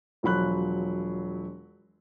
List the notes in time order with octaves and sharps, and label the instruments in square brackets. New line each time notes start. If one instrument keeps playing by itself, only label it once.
[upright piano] E1 F3 F#3 B5 F#6